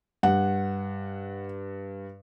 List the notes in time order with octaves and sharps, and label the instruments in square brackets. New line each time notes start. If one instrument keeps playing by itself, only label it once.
[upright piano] G2 [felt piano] F#5